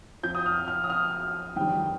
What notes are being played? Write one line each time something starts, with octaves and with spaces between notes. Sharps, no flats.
F2 F3 G6
D#6
F6
F6
D#6
F6
G1 F2 D#3 G3 G5